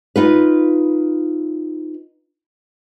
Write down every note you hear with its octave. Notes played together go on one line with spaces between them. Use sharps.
D#4 F4 B4